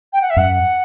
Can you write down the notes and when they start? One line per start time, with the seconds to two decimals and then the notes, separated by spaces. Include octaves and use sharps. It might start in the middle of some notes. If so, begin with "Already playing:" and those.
0.13 G5
0.21 F#5
0.30 E5
0.36 F#2 F#5